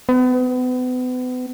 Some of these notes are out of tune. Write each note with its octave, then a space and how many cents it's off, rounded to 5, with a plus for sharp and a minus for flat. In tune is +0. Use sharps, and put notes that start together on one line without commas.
B3 +35